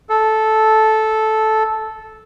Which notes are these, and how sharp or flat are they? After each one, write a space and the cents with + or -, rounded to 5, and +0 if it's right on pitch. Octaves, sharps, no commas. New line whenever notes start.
A4 -10